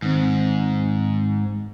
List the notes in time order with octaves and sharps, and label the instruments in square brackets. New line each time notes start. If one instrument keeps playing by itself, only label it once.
[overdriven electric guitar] G#2 [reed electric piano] D#3 C4